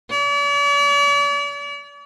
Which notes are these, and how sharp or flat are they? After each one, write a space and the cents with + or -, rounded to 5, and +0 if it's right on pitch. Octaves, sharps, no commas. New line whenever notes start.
D5 -45